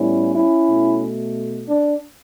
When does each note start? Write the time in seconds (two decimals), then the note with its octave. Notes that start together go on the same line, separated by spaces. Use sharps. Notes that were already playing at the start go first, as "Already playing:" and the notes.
Already playing: A2 G3 B3 C#4 E4
0.35 C#4 E4
0.69 B2 A3
1.68 D4